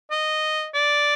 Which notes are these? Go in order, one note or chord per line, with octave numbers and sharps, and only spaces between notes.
D#5
D5